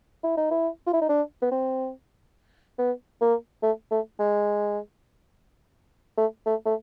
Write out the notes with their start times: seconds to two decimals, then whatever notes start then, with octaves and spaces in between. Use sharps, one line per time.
0.24 E4
0.37 D#4
0.51 E4
0.87 F4
0.93 E4
1.01 D#4
1.09 D4
1.42 B3
1.51 C4
2.78 B3
3.21 A#3
3.63 A3
3.91 A3
4.19 G#3
6.17 A3
6.46 A3
6.65 A3